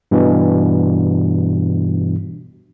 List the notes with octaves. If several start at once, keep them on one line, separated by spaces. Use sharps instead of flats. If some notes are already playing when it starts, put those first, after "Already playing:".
G2 B2 E3